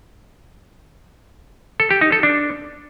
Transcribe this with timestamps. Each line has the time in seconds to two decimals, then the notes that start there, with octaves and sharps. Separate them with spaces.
1.80 A4
1.91 G4
2.01 D#4
2.12 A4
2.23 D4